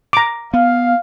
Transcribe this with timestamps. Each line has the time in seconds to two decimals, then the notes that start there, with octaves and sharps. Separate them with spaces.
0.13 A#5 D6
0.54 B3 F5